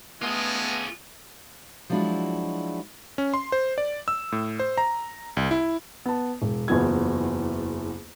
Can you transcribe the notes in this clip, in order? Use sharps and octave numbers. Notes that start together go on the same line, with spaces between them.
G#3 A3 B3 F4 G#4
F3 F#3 G#3 D4 E4 F#4
C#4
C6
C5
D5
E6
A2
C5
A#5
C2
E4
B3 A5
E1
F#1 E2 F#3 B3 F4 G#6